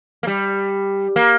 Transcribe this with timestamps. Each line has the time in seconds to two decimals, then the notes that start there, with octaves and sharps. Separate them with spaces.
0.23 A#3
0.27 G3
1.16 A#3